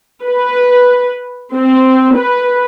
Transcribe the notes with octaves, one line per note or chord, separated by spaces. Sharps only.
B4
C4
B4